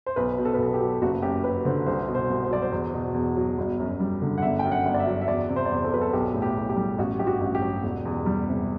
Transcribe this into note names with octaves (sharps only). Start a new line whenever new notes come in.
C5
B1 B4
B2
A4
B4
B1 A4
G4
F#3
F#1 F#4
F#2 G4
F#3 B4
D3 C5
C2 C5
B2
C5
C2
C5
F#3 D5
C5
E2
B2
E2
F#3
G1
F#2
G3
D3
F#5
G1 E5
F#2 G5
F#5
G1
D5
E5
F#3
E5
E2 D5
C3
C5
D5
E2 C5
A4
F#3 B4
A4
B1 G4
A2
G4
B1
G4
G3
A1 F#4
G2 G4
F#4
A1
G4
F#3
E1
E2
G3
C3